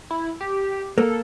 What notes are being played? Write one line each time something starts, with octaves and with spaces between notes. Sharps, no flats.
E4
G4
A#3 A4